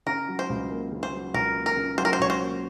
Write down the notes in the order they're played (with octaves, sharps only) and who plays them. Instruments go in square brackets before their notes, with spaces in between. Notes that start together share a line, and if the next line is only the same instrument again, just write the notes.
[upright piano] C#3 [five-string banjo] A#4
[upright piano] F#3
[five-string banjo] C5
[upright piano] C#2
A#3
C#3
[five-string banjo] C5
[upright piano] F#3
[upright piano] C#2 [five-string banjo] A#4
[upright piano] A#3
[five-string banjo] A#4
[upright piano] C#3
[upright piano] F#3 [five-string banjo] C5
[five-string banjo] A#4
C5
[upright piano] C#2 [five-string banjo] C#5
[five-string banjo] C5
[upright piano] A#3